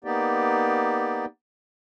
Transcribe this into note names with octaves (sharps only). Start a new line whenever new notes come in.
A#3 B3 D#4 G4 D5